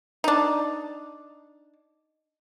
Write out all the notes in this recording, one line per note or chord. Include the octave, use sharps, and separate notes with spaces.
D4 D#4